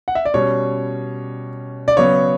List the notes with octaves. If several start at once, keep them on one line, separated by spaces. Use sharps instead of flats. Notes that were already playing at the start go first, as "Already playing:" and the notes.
F#5
E5
D5
B2 G3 C#4 C#5
D5
C#3 F#3 B3 C#5